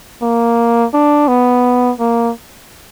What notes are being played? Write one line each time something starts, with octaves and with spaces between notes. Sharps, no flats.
A#3
D4
B3
A#3